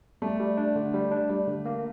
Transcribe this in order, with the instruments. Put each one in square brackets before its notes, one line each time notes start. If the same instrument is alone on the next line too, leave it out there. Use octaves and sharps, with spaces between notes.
[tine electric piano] G3 [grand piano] A3
[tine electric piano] G3
D4
D3
G3
D4
G3
D3
A#3